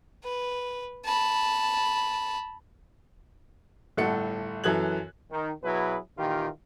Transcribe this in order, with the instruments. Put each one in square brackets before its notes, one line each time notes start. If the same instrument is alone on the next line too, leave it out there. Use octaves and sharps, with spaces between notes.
[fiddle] B4
A5 B5
[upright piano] G1 A2 A4 F#5 C#7
F#2 E3 A4 F#6 G#6 F#7
[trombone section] D#3
B2 F#3 E4 G#4 B4
A#2 D#3 E3 F4 G4